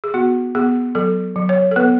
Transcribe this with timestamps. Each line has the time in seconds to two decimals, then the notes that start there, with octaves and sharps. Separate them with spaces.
0.04 G#4
0.14 B3 F#4
0.55 B3 G#4
0.95 F#3 A4
1.36 F#3
1.49 C#5
1.71 A4
1.76 B3 B4